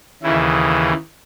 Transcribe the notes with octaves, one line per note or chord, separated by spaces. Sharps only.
D#2 C#3 E3 E4